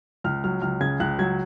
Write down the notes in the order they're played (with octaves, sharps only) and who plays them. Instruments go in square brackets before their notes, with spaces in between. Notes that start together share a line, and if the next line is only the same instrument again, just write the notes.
[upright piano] C#2 F6
F#3 F6
C#2 F6
C#3 G#6
C#2 F#6
F#3 G#6